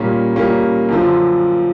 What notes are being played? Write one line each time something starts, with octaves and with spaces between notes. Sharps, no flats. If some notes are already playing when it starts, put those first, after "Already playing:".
Already playing: A#2 G3 A#3 C#4
A#2 G3 A#3 C#4
F#2 D3 F3